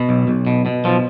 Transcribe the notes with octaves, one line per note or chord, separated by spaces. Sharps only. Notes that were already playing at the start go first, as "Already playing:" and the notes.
Already playing: B2
B1
B1
B2
B2
B1 F3